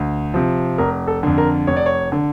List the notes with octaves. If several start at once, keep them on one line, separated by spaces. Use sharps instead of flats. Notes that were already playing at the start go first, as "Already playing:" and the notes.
Already playing: D2
C3 F3
F1 A#4
A4
F2 D3
A#4
F1 C#5
D5
C#5
D3